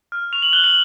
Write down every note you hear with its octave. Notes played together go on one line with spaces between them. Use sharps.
F6
C#6 F7
F#7
F#6 G7
F#7